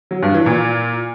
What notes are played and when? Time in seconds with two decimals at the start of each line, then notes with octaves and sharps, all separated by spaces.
0.11 F#3
0.23 G2
0.34 E3
0.46 A#2